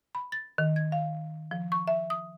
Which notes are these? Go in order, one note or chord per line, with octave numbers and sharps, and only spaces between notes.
B5
A6
D#3
G#6
F5
F3
C#6
E5
D#6